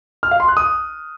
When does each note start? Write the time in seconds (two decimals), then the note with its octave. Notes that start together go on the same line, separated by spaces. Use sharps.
0.23 F6
0.31 F5
0.40 C6
0.48 F#6
0.57 D#6